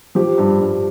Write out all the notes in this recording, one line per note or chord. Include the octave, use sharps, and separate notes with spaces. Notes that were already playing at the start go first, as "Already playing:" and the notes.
F3 G4
G2
G2